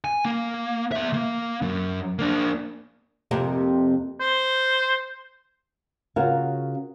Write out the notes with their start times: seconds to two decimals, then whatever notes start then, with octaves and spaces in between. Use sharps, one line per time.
0.04 G#5
0.25 A#3
0.92 B3 E5
1.14 A#3
1.62 F#2
2.19 A#3 D4
3.31 F2 C3 A#3
4.20 C5
6.16 C#3 F4 F#4 A#4 F5 G#5